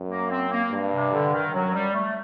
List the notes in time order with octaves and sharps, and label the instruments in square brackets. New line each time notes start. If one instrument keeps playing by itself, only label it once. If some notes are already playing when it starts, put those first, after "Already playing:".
Already playing: [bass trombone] F#2
[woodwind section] A#3
C4
A#3
[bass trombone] G2
[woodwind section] C3
D3
D#3
[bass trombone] F#2 [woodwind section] F#3
[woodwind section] G3
A3